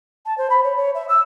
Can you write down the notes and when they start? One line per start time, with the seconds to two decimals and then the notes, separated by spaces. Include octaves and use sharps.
0.26 A5
0.38 C5
0.50 B5
0.64 C#5
0.77 C#5
0.95 E5
1.09 E6